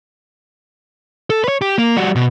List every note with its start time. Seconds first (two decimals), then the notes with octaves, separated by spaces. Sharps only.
1.30 A4
1.44 B4 C#5
1.62 G4
1.78 A#3
1.97 G3 F#4
2.16 B2